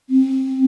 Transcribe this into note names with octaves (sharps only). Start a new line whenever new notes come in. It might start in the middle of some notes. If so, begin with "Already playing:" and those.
C4